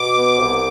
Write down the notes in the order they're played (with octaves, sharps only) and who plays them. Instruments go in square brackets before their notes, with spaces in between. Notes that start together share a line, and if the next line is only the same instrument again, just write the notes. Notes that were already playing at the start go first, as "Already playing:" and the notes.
Already playing: [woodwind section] B2 [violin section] D6
[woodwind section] B3
C2